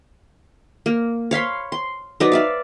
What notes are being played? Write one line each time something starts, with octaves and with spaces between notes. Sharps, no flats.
A#3
C#5 F5 B5 C6
C6
F#3 D#4 B4 D5
D5 E5 F5